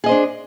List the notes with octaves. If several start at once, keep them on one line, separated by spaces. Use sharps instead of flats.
D4 G#4 C5 D#5